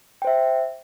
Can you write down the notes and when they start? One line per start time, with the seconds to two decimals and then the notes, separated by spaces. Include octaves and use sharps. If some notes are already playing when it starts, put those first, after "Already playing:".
0.22 G5
0.25 C5
0.27 E5